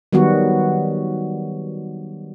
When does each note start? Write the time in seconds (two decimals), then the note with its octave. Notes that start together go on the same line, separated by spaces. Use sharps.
0.13 D#3 F#3 G3 B3 F#4